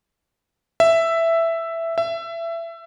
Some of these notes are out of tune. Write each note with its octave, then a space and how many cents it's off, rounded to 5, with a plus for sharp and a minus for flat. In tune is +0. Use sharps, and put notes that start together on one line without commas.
E5 +5
E5 +20